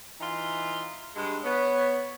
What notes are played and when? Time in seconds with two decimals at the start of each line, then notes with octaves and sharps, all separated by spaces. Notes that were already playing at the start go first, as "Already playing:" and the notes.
0.20 E3 D#4 F4
1.15 G2 G#3
1.45 B3 C#5